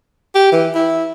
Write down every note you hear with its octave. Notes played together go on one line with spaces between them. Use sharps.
G4
E3
E4